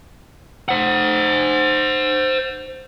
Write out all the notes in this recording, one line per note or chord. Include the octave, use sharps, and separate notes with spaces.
C5 F#5